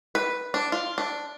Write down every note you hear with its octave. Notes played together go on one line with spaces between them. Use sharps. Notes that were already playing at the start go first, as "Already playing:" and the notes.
B4
D4
F4
D4